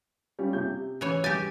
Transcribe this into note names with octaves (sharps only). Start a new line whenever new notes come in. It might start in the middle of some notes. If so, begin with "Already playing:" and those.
G3 C#4 F4
C3 G6
E3 C#4 C#5 G#5
G3 G4 G#5 A6